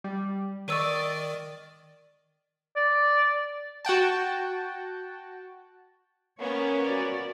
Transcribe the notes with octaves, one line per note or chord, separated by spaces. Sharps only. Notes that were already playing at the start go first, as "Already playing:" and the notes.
G3
D#3 D5 D#5 C#6 E6 D#7
D5
F#4 F#5 G5 A5
A#3 B3 C#4 C#5
F#4 D5